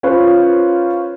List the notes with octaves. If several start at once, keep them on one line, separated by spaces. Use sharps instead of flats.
C#4 F4 B4 C5